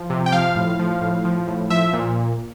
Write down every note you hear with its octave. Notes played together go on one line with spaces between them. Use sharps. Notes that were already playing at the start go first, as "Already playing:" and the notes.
Already playing: F3
C3
G5
F3 F5
A2
F3
A2
F3
A2
F3 E5
A#2